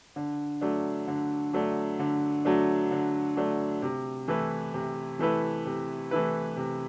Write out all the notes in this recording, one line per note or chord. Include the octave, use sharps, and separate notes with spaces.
D3
F#3 A3 D4
D3
F#3 A3 D4
D3
F#3 A3 D4
D3
F#3 A3 D4
C3
E3 A3 E4 B4
C3
E3 A3 E4 B4
C3
E3 A3 E4 B4
C3